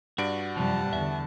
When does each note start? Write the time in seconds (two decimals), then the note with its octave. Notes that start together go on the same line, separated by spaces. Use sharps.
0.18 G2 F#4 D5 D7
0.57 F#2 C3 F3 G3 F#5 A5
0.93 E2 D3 E5